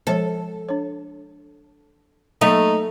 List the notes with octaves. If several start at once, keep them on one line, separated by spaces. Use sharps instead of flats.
F3 G#3 A4 C#5
D4 C#5
F#3 A3 A#3 D#4